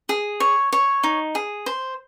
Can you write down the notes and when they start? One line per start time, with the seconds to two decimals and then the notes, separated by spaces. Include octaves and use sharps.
0.09 G#4
0.40 C#5
0.73 C#5
1.03 D#4
1.35 G#4
1.66 C5